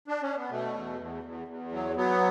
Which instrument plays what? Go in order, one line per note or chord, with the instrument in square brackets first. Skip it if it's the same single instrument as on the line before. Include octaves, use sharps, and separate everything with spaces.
[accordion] D4
C#4
B3
B2 A3
E2
E2
E2
E2
F#3
F#3 B3